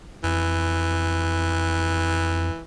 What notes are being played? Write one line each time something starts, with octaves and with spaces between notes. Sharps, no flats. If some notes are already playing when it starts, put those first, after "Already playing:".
F2 E3